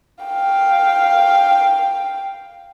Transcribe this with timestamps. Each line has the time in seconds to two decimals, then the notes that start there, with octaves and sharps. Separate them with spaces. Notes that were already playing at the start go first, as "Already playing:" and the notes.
0.24 F5 G5